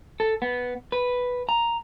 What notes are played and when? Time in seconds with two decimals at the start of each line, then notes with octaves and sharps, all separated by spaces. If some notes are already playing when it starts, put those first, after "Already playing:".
0.20 A4
0.42 B3
0.92 B4
1.49 A#5